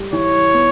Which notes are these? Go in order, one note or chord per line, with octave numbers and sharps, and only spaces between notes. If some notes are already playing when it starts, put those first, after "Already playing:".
Already playing: G3
E3 C#5
B3